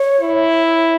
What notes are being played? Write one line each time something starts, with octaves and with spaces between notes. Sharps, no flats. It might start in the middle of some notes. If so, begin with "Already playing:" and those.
Already playing: C#5
E4